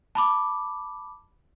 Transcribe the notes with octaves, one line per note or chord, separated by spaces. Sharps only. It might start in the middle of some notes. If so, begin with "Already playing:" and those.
A5 B5 D6